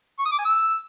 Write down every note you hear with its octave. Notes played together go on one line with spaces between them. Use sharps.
C#6
D#6
D6
G#5
E6